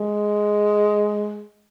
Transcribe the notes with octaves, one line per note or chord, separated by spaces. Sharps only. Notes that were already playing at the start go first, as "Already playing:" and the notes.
Already playing: G#3